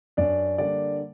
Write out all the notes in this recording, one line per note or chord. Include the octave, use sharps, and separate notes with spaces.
F#2 D4 D5
D3 G3 A#3 D4 D5